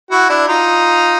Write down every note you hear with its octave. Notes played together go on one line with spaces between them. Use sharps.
E4 F#4
D4 E4
D#4 F4